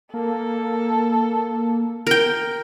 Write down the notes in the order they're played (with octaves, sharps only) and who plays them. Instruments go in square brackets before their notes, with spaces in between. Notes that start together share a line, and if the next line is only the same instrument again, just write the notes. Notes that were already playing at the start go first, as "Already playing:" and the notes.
[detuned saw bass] A#3 [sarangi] A4
[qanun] A#4 G5